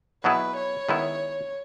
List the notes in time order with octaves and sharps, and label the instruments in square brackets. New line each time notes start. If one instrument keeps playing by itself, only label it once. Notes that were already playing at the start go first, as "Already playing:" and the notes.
[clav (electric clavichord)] B2 F#3 B3 E4 G#4 [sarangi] B4
[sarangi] C#5
[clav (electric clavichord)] D#3 G#3 B3 E4